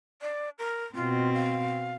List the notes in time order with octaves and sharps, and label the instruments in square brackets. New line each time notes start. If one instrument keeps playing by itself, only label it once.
[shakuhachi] D5
A#4
[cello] B2 C4 [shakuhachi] F4
[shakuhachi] F5